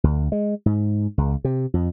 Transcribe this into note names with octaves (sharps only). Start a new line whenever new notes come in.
D2
G#3
G#2
C#2
C3
F2